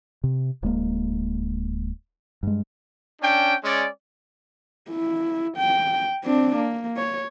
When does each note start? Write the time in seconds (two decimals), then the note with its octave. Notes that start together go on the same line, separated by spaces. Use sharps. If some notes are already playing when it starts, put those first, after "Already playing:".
0.24 C3
0.62 D1 G#3 A#3
2.43 G2 G#3
3.22 C#4 D4 G5
3.64 G#3 C#4 D5
4.90 E4
5.57 G5
6.23 C4 D4
6.56 A#3
6.97 C#5